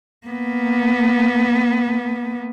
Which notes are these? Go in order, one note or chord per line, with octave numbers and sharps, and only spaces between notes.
A#3 B3